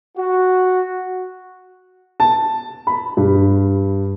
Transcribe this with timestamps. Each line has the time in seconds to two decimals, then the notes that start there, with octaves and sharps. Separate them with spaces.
0.17 F#4
2.20 A5
2.87 B5
3.17 G2